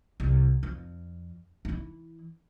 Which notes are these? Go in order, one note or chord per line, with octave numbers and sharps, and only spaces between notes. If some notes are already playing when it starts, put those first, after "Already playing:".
C2
F2
E3 E4